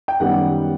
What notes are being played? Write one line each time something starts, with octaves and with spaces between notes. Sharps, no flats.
G5
F#2 D#3 G3 B3 F#5